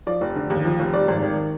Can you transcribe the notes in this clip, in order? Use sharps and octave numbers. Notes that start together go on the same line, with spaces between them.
F3 D5
F1
D3
D#2
F3
F1
G3 D5
G#1
D#3